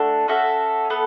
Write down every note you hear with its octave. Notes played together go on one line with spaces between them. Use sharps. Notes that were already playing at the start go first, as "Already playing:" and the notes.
Already playing: A3 D4 F#4 A4
C#4 F#4 A4 E5
B3 A4